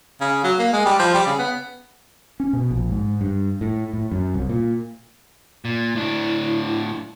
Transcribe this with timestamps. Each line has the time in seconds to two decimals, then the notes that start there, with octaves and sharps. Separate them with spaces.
0.21 C#3
0.44 F#3
0.59 A#3
0.73 G#3
0.85 G3
0.99 F3
1.14 G3
1.26 C#3
1.39 B3
2.40 C#4
2.53 B2
2.71 A#1
2.90 G#2
3.21 G2
3.61 A2
3.93 A2
4.12 F#2
4.34 C2
4.50 A#2
5.65 A#2
5.95 A2 D4 E4